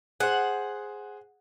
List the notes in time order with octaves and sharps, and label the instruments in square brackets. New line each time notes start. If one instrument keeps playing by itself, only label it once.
[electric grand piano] G#4 C5 [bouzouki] F#5